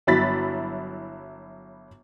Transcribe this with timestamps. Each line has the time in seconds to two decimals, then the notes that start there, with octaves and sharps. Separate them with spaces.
0.07 G1 F#3 E4 B5 A6 B6